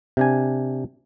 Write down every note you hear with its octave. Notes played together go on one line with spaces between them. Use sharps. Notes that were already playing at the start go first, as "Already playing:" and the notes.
C3 D4 G#5